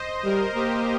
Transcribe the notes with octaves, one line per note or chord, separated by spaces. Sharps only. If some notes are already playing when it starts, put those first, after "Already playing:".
Already playing: C5 D#5
G3 A#4
A#3 G4